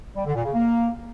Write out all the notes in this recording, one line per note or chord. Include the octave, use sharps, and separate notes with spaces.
G3
D3
A#2
C#3
A#3